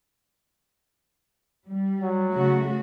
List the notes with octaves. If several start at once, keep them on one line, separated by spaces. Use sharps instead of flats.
G3
F#3
C#3 A3 F#4